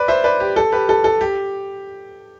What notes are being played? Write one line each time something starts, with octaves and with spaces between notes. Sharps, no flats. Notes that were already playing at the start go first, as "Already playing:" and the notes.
Already playing: B4 D5
C5 E5
B4 D5
G4
A4
G4 B4
A4
A4
G4